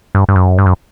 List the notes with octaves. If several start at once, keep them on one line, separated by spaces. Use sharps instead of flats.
G2
G2
F#2
G2
F#2